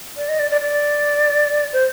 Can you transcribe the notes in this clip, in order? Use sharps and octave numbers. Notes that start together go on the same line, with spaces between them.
D5
D#5
D5
D5
D5
C5